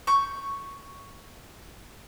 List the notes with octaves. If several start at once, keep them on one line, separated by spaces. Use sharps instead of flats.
C#6 G6